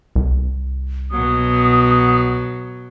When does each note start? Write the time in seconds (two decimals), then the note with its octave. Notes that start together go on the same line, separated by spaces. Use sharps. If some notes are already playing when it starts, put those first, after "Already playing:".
0.15 C2
1.11 B2 F#3 D#6